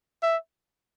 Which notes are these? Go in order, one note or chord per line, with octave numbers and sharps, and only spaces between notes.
E5